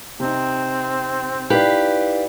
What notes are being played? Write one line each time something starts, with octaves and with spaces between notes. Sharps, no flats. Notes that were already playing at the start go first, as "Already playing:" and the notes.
C3 C4 D#4
D#4 E4 G4 B4 D5 F5